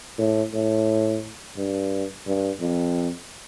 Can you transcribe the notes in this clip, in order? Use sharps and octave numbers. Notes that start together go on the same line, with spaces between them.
A2
A2
G2
G2
F2